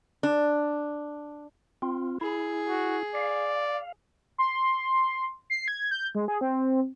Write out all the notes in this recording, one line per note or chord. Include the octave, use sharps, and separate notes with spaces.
D4
C4 F4
E4 G#4
F#4
D5 F5
C6
C7
G#6
G6
G#3
G#4
C4